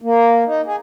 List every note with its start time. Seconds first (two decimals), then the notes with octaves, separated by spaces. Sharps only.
0.02 A#3
0.46 D#4
0.66 G#4